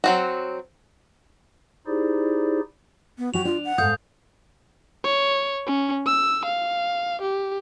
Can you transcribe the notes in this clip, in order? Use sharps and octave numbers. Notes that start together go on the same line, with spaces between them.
F#3 C4 F#4
D#4 E4 G4 G#4 C5 D5
B3
F#3 F#4 G4 F7
D4 F4
F#5
G#2 A4 F5 D#6 G6
C#5
C#4
E6
F5
G4